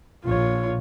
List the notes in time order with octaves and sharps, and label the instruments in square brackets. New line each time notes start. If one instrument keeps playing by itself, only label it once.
[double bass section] A#1 [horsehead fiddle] F4 C#5